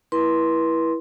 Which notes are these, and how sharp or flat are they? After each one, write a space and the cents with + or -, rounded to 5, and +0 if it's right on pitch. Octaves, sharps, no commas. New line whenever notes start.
E4 +0 B4 -35 C6 +0